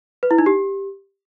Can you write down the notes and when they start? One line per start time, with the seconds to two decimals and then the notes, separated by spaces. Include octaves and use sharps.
0.23 B4
0.31 E4
0.38 D#4
0.46 G4